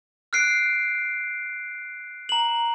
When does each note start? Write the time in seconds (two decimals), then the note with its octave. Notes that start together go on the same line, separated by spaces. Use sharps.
0.33 F6 F#6 C7 D7
2.29 A#5 F#7